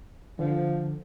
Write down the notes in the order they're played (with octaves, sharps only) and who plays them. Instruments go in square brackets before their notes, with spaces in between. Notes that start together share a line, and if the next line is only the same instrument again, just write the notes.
[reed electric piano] D3 [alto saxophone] F3